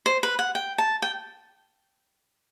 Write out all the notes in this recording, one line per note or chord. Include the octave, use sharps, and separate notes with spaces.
C5
B4
F#5
G5
A5
G5